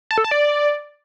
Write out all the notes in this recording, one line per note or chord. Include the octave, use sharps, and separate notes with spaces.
A5
A4
A5
D5